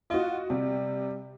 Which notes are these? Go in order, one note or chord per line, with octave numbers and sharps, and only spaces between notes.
F4 F#4 D#5
C3 G3